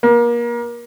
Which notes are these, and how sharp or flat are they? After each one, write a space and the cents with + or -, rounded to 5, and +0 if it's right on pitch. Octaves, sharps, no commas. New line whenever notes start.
A#3 +30